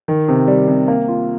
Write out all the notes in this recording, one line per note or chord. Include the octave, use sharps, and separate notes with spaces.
D#3
C3
G3
C3
A#3
F4